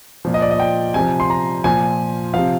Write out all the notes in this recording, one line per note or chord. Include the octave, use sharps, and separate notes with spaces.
A#2 F3
D#5
D5
D#5
G5
C3 F3 G#5
C6
A#5
A#2 F3 G#5
C3 F3 F5